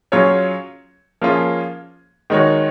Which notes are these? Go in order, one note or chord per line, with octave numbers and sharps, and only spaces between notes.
F#3 C#4 F4 G#4 C#5
F3 A#3 C#4 F4 G#4
D#3 G#3 D#4 F#4 C#5